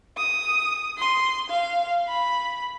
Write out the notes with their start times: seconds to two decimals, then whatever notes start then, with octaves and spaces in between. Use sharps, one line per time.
0.17 D#6
0.98 C6
1.50 F5
2.08 B5